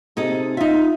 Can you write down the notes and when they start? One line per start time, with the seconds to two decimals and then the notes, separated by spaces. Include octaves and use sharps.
0.17 C3 D#4 G#4 A4
0.57 D#4 F4 E5